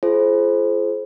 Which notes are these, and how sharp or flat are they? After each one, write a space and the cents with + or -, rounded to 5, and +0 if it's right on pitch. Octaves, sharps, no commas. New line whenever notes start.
F4 -30 G#4 +45 C5 +5